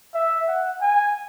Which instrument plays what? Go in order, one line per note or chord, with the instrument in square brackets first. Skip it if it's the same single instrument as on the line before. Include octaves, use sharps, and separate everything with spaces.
[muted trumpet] E5
F#5
G#5